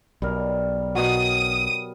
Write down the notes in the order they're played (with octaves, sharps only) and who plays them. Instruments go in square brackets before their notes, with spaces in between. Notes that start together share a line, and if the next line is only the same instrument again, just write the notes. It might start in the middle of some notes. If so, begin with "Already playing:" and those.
[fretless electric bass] B1 [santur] G3 A#4
[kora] B2 F#3 [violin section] D#6